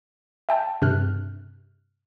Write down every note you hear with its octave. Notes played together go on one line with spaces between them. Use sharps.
E5 G5 A5
G2 C3 F6 F#6